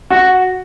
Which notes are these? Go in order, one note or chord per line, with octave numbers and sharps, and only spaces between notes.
F#4